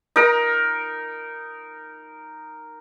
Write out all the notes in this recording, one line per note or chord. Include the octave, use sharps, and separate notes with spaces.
D#4 A#4